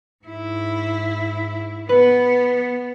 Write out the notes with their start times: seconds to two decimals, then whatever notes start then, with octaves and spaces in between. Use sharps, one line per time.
0.24 G#2 E4
1.89 B3 B4